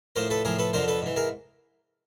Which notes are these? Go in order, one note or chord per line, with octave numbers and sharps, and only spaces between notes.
A2 F3 A#4 C5
A4 B4
A2 F3 G#4 A#4
A4 B4
F2 D3 F3 A#4 C5
A4 B4
G#2 E3
G#4 A#4